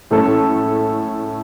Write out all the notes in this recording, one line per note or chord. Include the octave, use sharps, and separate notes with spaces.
A2 A3 C#4 A4